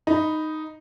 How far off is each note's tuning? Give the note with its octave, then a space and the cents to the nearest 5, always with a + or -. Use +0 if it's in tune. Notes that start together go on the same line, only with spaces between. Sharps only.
D#4 +0 B5 +0